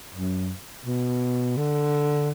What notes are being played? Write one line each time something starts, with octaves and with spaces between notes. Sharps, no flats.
F#2
B2
D3